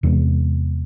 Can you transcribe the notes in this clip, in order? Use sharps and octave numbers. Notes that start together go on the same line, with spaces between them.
E2 C3 G#3 B3